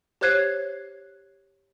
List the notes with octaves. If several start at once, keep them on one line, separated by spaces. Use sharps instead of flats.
G4 C5 C#5 F#6 G#6 C7